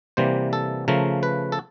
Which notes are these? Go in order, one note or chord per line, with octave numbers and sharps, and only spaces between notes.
C3 E3 G3 A#3 C5
A4
C#3 F3 A3 A#4
B4
A4